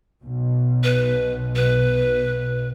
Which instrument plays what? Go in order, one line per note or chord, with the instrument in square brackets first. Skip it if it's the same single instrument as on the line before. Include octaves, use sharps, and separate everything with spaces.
[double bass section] B1 B2
[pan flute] B4
B4